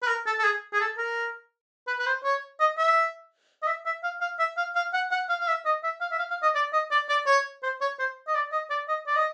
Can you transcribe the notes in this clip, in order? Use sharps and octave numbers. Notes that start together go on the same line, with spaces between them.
B4
A#4
A4
A4
G#4
G#4
A4
A#4
B4
B4
C5
C#5
D#5
E5
D#5
E5
E5
F5
F5
E5
F5
F5
F#5
F#5
F5
F5
E5
D#5
E5
F5
E5
F5
F5
D#5
D5
D#5
D5
D5
C#5
C5
C#5
C5
D#5
D5
D#5
D5
D#5
D5
D#5